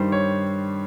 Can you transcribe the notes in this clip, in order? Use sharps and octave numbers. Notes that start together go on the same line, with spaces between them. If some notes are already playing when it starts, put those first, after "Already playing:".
Already playing: G2 D#3 G3 C5
C#5